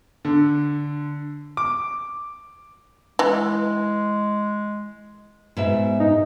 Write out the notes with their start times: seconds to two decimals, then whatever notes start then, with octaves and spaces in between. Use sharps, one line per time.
0.25 D3
1.57 D6
3.19 E3 G#3
5.57 G#2 B2 E5
6.00 D#4